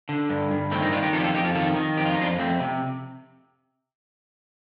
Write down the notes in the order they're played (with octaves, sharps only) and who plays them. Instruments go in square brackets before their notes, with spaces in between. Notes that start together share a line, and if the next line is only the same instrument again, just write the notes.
[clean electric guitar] D3
G2
G2
D#3 A3 C4
C4 D#4
D#3 D4 F4
D#4 G4
F2 F4 A4
G4
F4 A4
F2 D#4 G4
F4 A4
D#3 F4 A4
D#3
F2 G4
F4
D#4
F2 D4 F4
F2 A3 C4
C3